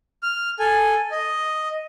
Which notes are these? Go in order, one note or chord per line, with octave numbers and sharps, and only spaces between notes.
F6
A4 G#5
D#5